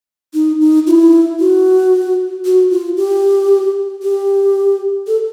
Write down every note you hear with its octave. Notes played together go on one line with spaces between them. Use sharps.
D#4
D#4
F4
E4
F#4
F#4
F4
G4
G4
A4